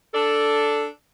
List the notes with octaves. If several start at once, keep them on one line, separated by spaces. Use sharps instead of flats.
D4 A4